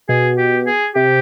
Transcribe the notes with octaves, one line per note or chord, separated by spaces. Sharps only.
B2 G#4
G4
G#4
C3 G4